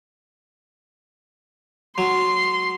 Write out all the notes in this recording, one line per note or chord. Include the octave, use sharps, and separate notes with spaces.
F#3 C6